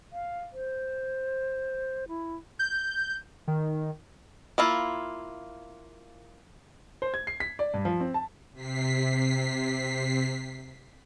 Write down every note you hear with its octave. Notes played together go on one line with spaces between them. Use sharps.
F5
C5
E4
G6
D#3
A#3 E4 F4
C5
G#6
C7
B6
D5
G2
F3
C4
A5
C3 B6 C7